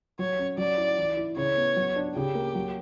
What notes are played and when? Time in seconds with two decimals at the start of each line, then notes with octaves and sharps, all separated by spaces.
0.19 F#3 C#5
0.39 C#4
0.58 F#3 D5
0.77 E4
0.98 E3
1.17 E4
1.37 C#3 C#5
1.57 B3
1.76 F#3
1.96 D4
2.15 C#3 G4
2.35 A#3
2.55 F#3